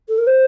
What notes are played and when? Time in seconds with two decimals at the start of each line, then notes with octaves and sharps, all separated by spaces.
0.08 A4
0.18 A#4
0.27 C5